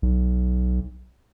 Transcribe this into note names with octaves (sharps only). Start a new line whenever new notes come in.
B1